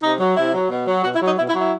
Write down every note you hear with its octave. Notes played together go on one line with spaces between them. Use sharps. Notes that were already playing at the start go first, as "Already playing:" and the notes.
C3 D#4
F#3
C3 E4
F#3
B2
F#3
B2 F#4
E4
F#3
D#4
B2 E4
E4
F#3
E4